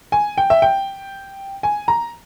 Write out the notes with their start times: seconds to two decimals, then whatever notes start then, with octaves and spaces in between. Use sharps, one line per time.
0.12 G#5
0.38 G5
0.50 E5
0.62 G5
1.63 G#5
1.88 A#5